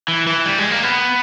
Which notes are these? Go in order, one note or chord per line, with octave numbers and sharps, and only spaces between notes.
E3
E3
G3
G#3
A#3
B3